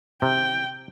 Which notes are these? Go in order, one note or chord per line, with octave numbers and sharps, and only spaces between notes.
C3 G5